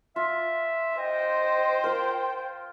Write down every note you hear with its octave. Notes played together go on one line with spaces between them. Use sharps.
F4 E5
C5 D#5 G5
F4 A#4